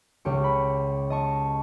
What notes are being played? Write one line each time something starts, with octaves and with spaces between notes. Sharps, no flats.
C#2 G4 C#6
B5
D#5 A5 C#6